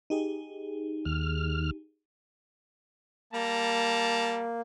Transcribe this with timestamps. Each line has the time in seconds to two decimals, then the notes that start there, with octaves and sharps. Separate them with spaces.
0.10 D#4 G4 G#4
1.05 D#2 F6
3.33 G3 A#3 A5 A#5